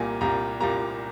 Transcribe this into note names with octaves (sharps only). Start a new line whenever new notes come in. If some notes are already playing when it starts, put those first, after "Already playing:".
Already playing: C2 A#2 G3 A#3 G#5
C2 A#2 G3 A#3 A#5
C2 A#2 G3 A#3 A#5